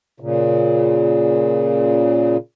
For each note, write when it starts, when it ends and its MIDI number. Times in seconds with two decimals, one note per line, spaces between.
0.20 2.37 46
0.20 2.37 49